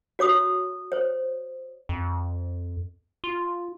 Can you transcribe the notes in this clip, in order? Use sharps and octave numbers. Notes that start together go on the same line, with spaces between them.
F#4 C#5 D6 D#6
C5 C#5
F2
F4